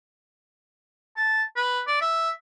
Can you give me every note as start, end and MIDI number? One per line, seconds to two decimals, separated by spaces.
1.16 1.43 81
1.56 1.81 71
1.87 1.97 74
2.01 2.30 76